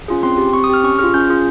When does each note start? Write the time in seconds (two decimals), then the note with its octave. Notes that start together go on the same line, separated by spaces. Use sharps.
0.08 C#4 F4 G#4
0.23 C4 C6
0.38 G4
0.53 C4 C#6
0.64 D#6
0.69 G4 F6
0.84 C#4 C#6
0.99 F4 G#4 F6
1.14 C#4 G6
1.30 F4 G#4